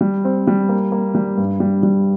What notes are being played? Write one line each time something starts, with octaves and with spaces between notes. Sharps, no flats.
G3
C4
G3
A#3
A#3
G3
G2
G3
G3